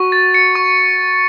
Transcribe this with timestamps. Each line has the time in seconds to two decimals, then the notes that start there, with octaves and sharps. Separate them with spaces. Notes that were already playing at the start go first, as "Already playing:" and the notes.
Already playing: F#4 C#6
0.12 A6
0.34 C#7
0.56 C#6